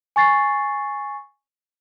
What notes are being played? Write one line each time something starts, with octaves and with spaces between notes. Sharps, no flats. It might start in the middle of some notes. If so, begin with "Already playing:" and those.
G#5 C#6 A6 C7